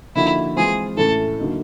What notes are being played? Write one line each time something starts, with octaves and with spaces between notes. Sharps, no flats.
D3 F3 A#3 D#4 E4 F#4
E3 G#3 C4 F4 G#4
A2 E3 A3 C#4 E4 A4
D3 F#3 A#3 D#4